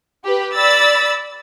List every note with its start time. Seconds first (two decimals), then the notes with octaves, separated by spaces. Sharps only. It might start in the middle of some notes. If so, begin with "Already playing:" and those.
0.24 G4 B4
0.54 D5 B5 E6 A6